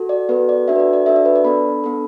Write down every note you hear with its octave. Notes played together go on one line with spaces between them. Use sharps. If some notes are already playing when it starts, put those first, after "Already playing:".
Already playing: F#4 A4
D5
B3 F#4 A4 B4
D5
D4 F#4 A4 E5
B4
D5
D5
D4 F#4 A4 E5
D5
B4
D5
B3 D4 A4 B5
B3 D4 A4